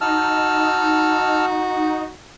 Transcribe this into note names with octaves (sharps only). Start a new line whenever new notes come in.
D#4 F#4 A5 E6 F6